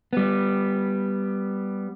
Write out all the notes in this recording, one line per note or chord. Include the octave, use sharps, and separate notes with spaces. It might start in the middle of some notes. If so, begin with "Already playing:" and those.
G3 B3